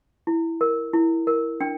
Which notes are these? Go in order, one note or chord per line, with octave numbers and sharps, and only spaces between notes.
E4
A#4
E4
A#4
D4 G5